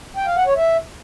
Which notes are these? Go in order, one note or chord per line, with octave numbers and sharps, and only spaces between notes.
G5
F5
F#5
C#5
E5